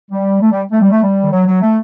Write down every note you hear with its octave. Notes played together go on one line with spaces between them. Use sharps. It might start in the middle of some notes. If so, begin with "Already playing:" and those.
G3
A3
G3
A3
G3
A3
G3
D#3
F#3
F#3
A3